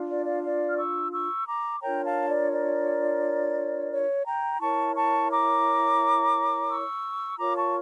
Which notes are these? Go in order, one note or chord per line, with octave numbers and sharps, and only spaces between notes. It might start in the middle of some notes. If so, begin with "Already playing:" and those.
Already playing: D4 F4
D5
D5 F5
D5 F5
F6
C#6 E6
C#6 E6
A#5 D6
D4 F4 A#4 C#5 G5 A#5
F5 A5
D5
D5
C#5
G5 A#5
E4 A#4 C#5 A5 C#6
A5 C#6
A#5 D6
C#6 E6
F4 A#4 C#5 A#5 D6
A5 C#6